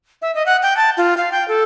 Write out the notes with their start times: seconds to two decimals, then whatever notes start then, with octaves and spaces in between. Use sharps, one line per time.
0.22 E5
0.35 D#5
0.46 F#5
0.62 G5
0.76 A5
0.97 F4
1.17 F5
1.32 G5
1.48 A4